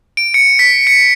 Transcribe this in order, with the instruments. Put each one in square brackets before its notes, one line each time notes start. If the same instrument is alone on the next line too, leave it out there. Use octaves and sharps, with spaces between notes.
[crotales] D7
C#7
B6
C#7